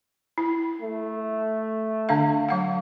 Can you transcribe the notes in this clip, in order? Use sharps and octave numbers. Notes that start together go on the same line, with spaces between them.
E4
A3
D3 D4 F5
F#3 F5 F#5